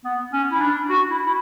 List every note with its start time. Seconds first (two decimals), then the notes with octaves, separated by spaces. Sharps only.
0.05 B3
0.33 C#4
0.51 E4
0.61 D4
0.89 F#4
1.10 E4
1.26 E4